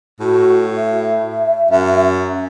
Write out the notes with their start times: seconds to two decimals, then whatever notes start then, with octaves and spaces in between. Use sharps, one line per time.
0.20 A2 F#4
0.76 E5
1.71 F#2